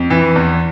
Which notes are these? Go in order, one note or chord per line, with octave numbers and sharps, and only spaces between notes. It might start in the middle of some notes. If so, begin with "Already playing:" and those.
Already playing: F2
E3
E2